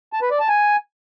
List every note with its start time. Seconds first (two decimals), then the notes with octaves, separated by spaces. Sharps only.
0.13 A5
0.22 B4
0.31 D5
0.40 A5
0.49 G#5